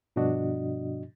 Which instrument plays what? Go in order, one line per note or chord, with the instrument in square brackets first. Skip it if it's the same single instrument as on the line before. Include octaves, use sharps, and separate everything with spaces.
[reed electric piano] G2 B2 F3 D4 F#4 D#5